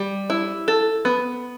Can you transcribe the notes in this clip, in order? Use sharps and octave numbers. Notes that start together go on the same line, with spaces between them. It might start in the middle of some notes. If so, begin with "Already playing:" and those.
Already playing: G3
E4
A4
B3